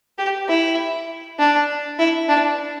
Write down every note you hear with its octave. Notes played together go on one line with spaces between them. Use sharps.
G4
E4
D4
E4
D4